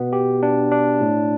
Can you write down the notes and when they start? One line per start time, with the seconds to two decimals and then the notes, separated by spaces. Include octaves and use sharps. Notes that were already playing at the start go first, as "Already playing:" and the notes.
Already playing: B2 B3
0.13 G4
0.43 D4
0.72 D4
1.01 A2